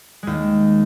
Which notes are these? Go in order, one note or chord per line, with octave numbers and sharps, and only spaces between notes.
D#2 G#3